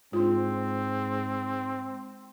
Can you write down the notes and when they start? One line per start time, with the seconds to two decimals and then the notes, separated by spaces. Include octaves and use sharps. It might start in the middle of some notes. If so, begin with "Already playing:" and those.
0.13 G#2 C4 D4 F4